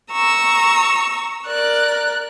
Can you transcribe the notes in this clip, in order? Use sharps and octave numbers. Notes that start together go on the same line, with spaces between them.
A#5 C#6 E6
A#4 D5 F#6